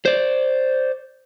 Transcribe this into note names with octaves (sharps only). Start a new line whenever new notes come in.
C5 D5